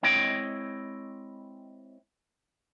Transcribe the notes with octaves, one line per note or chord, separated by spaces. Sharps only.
G#3 C4 E4 C#5 D#5 G5